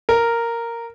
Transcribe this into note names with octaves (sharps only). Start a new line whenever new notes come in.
A#4